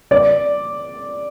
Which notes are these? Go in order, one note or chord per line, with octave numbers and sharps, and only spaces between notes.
D5